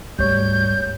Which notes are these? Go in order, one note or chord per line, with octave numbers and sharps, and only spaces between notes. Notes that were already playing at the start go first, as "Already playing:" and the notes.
D2 G#2 G3 C#5 G6